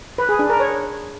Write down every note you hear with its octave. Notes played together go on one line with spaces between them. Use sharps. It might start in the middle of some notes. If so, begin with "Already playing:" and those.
B4
G#4
D4
A#4
C#5